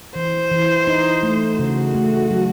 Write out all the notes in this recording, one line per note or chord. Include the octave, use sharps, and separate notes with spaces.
E3 C5
E3
D#4
A3
C#3 F#4
A3
F#3